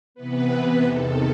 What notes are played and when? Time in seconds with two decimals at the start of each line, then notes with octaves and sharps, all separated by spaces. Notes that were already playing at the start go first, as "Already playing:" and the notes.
0.14 C3 E3 B3 B4
0.82 E2 C3 D#3 A4